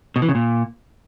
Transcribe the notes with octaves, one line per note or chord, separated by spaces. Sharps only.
B2
E3
C#3
A#2